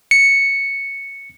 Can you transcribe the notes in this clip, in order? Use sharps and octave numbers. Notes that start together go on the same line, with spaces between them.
C#7